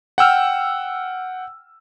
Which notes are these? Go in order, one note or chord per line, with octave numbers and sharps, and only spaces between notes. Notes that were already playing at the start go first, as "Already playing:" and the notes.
F#5 G5 E6 F6